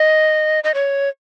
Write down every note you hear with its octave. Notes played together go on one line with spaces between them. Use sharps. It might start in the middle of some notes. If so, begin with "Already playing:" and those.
Already playing: D#5
D#5
C#5